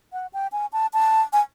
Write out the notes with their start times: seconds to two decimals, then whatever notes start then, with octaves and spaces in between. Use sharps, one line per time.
0.13 F#5
0.33 G5
0.52 G#5
0.73 A5
0.93 A5
1.33 G#5